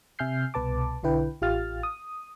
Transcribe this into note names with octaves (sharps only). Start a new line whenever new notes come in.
C3 E5 G#5 F6 G6 C7
C2 B2 B4 A5 D6
B1 D3 E4 B4 G5
A1 F4 G4 F5 F6 A6
D#6